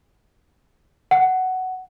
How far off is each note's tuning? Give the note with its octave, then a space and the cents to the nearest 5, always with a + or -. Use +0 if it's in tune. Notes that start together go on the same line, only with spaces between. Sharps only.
F#5 +10